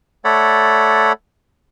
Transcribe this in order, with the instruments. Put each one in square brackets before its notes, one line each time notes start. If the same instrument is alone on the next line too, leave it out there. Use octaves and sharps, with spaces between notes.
[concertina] A3 A4 C#5 D5 F#5 B5